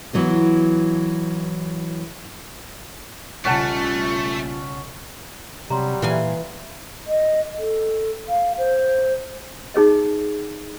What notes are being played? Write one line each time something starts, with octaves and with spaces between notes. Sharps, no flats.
E3 F#3 B3 F#4
B1 C#3 G3 A3 C#4 F4 F#5 A5
C3 F#3 G3 A#5 C6
A#2 E3 F5 G#5
D#5
A4
F5
C5
D#4 G#4 C#5 D#5